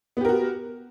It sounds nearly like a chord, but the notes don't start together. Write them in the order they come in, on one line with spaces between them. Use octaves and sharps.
B3 G4 A#4 F#4